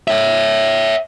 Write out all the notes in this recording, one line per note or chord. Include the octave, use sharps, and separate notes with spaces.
C#5 E5